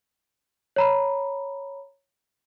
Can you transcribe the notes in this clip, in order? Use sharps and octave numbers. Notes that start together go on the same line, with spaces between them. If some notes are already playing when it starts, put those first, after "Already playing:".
C#5 A#5 B5